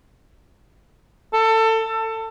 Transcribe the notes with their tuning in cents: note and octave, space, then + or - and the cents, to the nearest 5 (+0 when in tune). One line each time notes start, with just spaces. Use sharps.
A4 +25